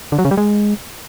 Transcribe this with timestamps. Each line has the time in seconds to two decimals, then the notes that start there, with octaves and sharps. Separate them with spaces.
0.12 D3
0.18 F#3
0.25 C#3
0.31 G3
0.37 G#3